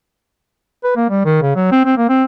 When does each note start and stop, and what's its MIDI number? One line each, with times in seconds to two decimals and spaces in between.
0.84 0.92 71
0.96 1.05 58
1.10 1.21 55
1.25 1.41 51
1.42 1.56 49
1.56 1.67 54
1.72 1.82 60
1.85 1.94 60
1.97 2.08 58
2.09 2.24 60